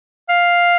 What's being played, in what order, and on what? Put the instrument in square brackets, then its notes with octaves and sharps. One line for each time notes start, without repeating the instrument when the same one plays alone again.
[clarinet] F5